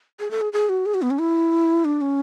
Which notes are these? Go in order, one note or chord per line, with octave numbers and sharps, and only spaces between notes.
G#4
A4
G#4
G#4
F#4
G#4
F#4
B3
C#4
E4
D4
C#4